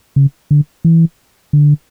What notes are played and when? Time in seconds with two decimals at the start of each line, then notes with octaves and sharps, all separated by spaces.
0.16 C#3
0.51 D3
0.85 E3
1.53 D3